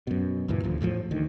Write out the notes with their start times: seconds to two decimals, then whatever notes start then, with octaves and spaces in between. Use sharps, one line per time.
0.07 F#2 B2
0.48 C#2 G2 A#2 E3
0.64 D#1 D2 F3
0.81 E2 A2 E3 F3
1.11 D2 D#3